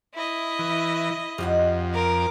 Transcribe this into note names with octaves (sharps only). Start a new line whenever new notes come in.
E4 D#5
E3
F2 G3 D#5 F#5
A#4 D6